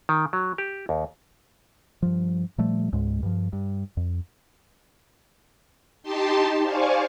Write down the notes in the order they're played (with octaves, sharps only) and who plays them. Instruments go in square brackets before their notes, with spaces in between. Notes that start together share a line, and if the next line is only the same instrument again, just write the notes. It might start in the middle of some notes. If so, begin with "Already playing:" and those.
[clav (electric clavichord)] D#3
F#3
G4
D#2
[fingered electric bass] G2 F3
A#2 F3 G3 A3
C#2 G#2 G#3
G2 F3
G2
F2
[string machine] D#4 G4 A5 C6
C5 D5 F5 G#5 C#6